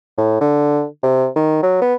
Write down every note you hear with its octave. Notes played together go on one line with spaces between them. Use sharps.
A2
D3
C3
D#3
F#3
B3